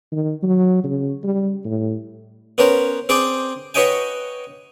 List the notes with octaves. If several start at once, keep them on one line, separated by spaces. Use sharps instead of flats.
D#3
F#3
C#3
G3
A2
B3 C#4 A#4 C5
C4 G#4 C5 D5 G5
F#4 B4 C#5 D#5 G5 G#5